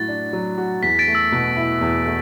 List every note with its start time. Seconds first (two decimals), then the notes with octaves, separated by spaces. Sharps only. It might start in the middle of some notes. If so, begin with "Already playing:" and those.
Already playing: A2 F#3 F#4 A6
0.08 D4
0.33 F#3
0.58 F#4
0.82 E2 B6
0.99 A6 D7
1.07 A3
1.15 E6
1.32 B2
1.57 E4
1.81 E2
2.06 A3